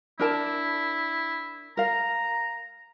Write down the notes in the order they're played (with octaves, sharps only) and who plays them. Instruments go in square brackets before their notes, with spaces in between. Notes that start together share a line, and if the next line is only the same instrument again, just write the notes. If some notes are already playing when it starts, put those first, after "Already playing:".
[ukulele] D4 A#4 A5 [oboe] E4
[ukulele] A#4 F5 [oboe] A#5